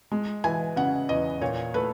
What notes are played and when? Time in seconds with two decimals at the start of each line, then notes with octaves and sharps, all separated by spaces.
0.12 G#3
0.44 E3 G#5
0.76 C#3 F#5
1.09 E2 D#5
1.41 A#2 C#5
1.74 A3 B4